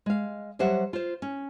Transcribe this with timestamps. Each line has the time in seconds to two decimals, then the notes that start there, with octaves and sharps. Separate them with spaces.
0.06 G#3 F5
0.59 F#3 G3 C5 E5 F#5
0.93 F4 C5
1.22 C#4